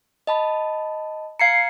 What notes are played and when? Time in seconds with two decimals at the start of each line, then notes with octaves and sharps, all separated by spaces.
0.27 D#5 A5 B5
1.40 F5 A#5 G#6 C7 C#7